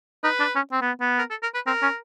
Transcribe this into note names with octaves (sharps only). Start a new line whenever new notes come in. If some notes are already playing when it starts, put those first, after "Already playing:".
D#4 B4
D4
C#4
C4
B3
B3
A#4
A4
A#4
B4
C4 A#4
C#4